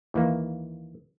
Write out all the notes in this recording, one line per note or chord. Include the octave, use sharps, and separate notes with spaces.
D#2 E3 A#3